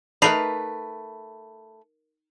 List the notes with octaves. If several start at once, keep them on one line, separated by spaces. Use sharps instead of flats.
A3 D#4 A#4 B4 B5 C7 F7